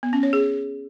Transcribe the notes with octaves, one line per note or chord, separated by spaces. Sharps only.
B3
C#4
C#5
G#4